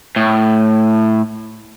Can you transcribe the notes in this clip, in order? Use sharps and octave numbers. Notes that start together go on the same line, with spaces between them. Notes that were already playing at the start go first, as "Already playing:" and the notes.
A2